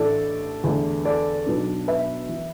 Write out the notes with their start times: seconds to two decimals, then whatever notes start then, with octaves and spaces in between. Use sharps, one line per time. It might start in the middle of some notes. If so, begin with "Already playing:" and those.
Already playing: A1 A2 A3 D4 A4 D5
0.64 E2 D3 A3
1.05 A4 D5
1.46 B1 B2 B3 D4
1.88 B4 E5
2.29 E3